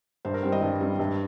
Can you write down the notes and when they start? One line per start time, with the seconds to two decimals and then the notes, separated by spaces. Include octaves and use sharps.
0.25 G2 C5
0.34 A#4
0.43 G3 C4 C5
0.52 D#5
0.62 G2
0.81 G3 C4
0.99 G2